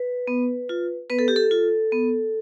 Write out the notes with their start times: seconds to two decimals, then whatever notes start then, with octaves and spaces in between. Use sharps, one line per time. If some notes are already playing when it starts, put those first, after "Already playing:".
Already playing: B4
0.27 B3
0.69 F4
1.10 B3 B4
1.19 A4
1.28 G4
1.36 A4
1.51 F4
1.92 B3